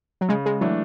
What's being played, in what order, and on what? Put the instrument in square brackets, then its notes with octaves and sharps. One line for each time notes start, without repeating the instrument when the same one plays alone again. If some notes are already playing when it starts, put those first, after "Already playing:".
[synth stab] F#3
[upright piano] C#3 [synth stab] G#3
[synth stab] G#3
[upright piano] E3 A3 D4 [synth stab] F#3